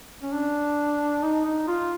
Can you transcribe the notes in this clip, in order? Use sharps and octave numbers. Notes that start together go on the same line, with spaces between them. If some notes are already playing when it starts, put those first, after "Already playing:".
C#4
D4
D#4
D#4
F4